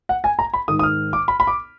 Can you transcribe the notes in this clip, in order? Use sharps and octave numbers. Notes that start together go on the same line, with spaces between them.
F#5
G#5
A#5
B5
G#2 D#3 D#6
D#6
F6
D6
B5
B5
D6